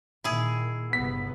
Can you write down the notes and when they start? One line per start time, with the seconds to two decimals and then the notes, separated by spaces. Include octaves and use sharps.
0.24 A#2 D#3 E4 G#4
0.93 G1 C3 B3 B6